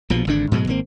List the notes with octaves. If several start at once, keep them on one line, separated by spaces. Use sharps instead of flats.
A#1 B2 F3
G#1 G#2 D3 D4
G#2 B2 F#3 G#3
G#1 A#3 C4